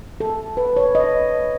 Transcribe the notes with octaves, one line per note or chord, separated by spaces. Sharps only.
A4
B4
C#5
D#5